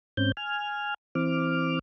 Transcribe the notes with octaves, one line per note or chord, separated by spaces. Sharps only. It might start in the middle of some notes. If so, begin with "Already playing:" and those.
G#2 C4 C#4 G6
G#5 F6
E3 C4 D6 F6